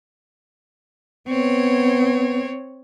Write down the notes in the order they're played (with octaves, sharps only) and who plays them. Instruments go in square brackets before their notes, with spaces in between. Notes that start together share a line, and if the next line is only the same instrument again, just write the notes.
[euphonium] B3 [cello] C4 C#5